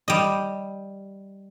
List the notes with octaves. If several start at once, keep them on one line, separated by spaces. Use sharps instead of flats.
G3 D#5